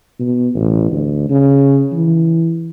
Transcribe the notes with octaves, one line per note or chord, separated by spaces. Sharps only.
B2
A1
D2
C#3
E3